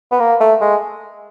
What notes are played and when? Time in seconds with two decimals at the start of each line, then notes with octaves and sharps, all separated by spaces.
0.12 B3
0.20 A#3
0.40 A3
0.61 G#3